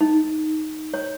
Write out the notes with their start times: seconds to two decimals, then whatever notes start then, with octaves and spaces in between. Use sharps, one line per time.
0.01 D#4
0.94 C#5